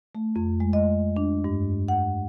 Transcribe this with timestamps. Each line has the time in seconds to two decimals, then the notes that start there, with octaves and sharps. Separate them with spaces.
0.15 A3
0.36 F2
0.60 G#3
0.73 D#5
1.17 D4
1.44 G2
1.88 F#5